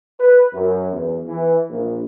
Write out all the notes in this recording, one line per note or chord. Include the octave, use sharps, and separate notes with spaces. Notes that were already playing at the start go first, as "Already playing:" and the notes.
B4
F#2
E2
E3
A#1